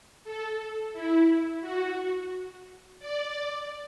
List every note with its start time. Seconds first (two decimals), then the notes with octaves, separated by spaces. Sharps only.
0.24 A4
0.93 E4
1.61 F#4
2.99 D5